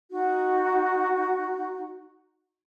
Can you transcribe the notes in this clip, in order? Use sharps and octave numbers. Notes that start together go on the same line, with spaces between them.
D#4 F#4